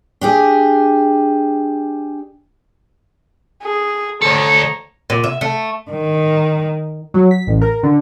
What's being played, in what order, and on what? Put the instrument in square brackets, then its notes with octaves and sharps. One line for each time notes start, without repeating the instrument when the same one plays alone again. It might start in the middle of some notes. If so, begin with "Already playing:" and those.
[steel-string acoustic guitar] D4 G4 G#4
[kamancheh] G#4
[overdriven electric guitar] D2 A4 [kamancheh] C#5 A#5
[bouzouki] A#2
E5
A3
[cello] D#3
[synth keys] F#3
B6
A1
A#4
D3